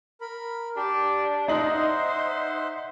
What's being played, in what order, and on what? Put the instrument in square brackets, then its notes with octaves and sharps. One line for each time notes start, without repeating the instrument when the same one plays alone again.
[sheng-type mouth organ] A#4 B5
[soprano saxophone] D4 [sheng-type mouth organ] G4 D5
[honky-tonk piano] D#4 D5 F#7 [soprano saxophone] C5 [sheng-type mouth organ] E5 F#5 C6